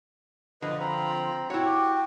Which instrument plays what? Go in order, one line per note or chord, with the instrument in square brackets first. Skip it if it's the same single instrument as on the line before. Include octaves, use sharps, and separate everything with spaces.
[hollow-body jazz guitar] D3 F3 [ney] F4 [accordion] B4 D#5
[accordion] C4 [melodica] A#5 B5
[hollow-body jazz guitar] E4 C#5 [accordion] F#4 [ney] G5
[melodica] G4